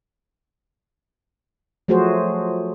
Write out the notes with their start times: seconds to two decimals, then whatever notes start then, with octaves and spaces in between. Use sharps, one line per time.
1.88 F3 F#3 A3 F#4 G#4 C5